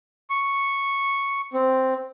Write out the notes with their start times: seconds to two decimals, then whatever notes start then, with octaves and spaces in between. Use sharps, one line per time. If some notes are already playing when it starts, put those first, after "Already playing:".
0.30 C#6
1.53 C4